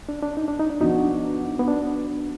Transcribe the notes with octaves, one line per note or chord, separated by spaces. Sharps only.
D4
D4
D#4
D4
D#4
D4
F3 B3 D4 D#4 F#4
B3
D4